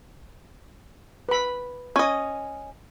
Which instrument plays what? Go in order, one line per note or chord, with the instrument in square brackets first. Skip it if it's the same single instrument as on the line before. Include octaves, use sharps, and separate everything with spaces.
[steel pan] B4 B5
[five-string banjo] C#4 D#5 [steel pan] G#5